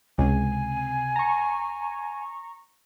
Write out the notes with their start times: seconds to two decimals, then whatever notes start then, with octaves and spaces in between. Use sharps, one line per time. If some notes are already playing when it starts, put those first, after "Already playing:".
0.18 C#2 C3 G#5
1.16 A#5 C#6